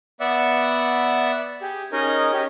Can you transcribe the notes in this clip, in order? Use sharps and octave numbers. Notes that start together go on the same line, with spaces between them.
B3 D5 E5 F#5
G4 G#4
C#4 D#4 G#4 A#4 D#5
C#4 G4